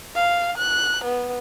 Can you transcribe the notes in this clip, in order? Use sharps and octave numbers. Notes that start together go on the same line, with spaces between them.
F5
F#6
B3